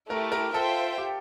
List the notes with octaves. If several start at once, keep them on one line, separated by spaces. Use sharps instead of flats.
A3 E4 G4 A#4
A#4
F4 A4 C5 E5 G5
G4